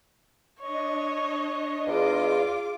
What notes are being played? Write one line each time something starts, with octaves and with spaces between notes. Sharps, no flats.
D4 C#5 D#5
E2 F4 G#4 D6